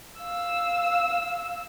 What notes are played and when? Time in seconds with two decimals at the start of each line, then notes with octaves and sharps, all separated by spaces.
0.21 F5 E6